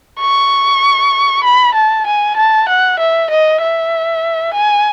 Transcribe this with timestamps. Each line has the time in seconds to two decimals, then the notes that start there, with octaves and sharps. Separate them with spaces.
0.20 C#6
1.44 B5
1.75 A5
2.07 G#5
2.37 A5
2.68 F#5
2.99 E5
3.30 D#5
3.62 E5
4.54 G#5